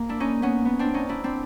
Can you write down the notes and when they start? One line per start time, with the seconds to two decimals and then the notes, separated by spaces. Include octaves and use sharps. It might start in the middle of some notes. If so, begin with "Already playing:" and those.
Already playing: A#3
0.09 D4 E4
0.20 C#4 D#4
0.42 B3 C#4
0.65 B3
0.79 C4 D4
0.94 C#4 D#4
1.09 D4 E4
1.24 C4 D4